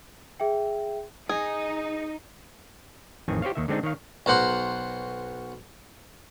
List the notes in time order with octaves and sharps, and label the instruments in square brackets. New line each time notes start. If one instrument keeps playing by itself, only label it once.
[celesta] G#4 E5 G5
[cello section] D#4 [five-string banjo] G#4
[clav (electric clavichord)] A1 F2 D#3 C4 G#5
G4 C5 C#5 F5
D#2 D#3 E5
D3 G#3 C4 D4 D#4
D#3 C#5 F5
[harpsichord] B1 A#4 C5 F#5 C6